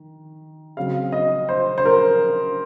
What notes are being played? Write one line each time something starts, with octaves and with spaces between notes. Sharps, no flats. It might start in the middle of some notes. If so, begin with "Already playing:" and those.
Already playing: D#3
C#3 F#3 C4 F5
D#5
C5
C5
A#4